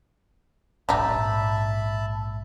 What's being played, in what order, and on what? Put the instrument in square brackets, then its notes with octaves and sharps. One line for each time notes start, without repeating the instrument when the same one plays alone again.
[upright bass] A#1 G#2 [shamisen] G3 D4 D#4 [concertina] E5 A5 B5